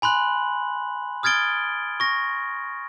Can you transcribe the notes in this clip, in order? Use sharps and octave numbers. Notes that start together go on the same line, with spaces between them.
G#5 B5 C6 F#6 F#7
D#6 F6 G#6 A6 D7 G7
C#6 A#6